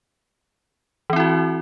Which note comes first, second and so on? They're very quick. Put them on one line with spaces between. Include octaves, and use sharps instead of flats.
E3 C4 E4 F#4